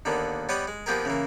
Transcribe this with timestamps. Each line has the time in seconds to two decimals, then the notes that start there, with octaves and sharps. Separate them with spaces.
0.05 D#2 D3 A#3 B3
0.49 G3 B3 C#5 D#5 D6 D#6
0.68 G#3
0.86 F3 A#3 B3 G4 G#4 A#4
1.05 C#3 E3 A#3